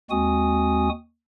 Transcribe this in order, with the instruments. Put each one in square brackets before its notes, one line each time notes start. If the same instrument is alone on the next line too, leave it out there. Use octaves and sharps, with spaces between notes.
[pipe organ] D#2 G#3 C4 F#4 G#5 D#6